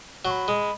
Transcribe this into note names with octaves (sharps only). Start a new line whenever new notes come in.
F#3 C#6
B5
G#3